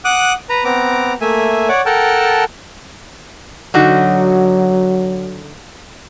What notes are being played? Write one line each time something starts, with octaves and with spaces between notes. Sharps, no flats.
F#5 D6 D#6 F#6
B4 A#5
B3 C4 A#5 D6
A3 A#3 E5 G#5
C#5 D5 F#5 D6
A4 A#4 F#5 G5 A5
D3 F#3 D#4 F#4